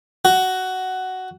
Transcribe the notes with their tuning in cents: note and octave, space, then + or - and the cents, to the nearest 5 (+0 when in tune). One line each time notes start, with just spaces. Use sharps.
F#4 +10